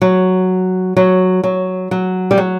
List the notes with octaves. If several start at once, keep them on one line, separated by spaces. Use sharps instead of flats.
F#3
F#3
F#3
F#3
G3
F#3